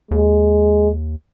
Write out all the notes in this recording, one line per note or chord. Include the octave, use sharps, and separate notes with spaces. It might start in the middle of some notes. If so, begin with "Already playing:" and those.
D#2 G#3